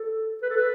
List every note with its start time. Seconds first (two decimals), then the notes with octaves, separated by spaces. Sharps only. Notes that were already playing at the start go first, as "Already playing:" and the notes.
Already playing: A4
0.43 B4
0.50 A4
0.57 B4